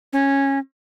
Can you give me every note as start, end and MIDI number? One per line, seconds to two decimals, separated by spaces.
0.13 0.59 61